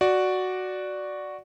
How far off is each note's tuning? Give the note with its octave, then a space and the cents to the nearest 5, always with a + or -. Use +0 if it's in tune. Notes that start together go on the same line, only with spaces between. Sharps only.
F#4 +0 D5 +0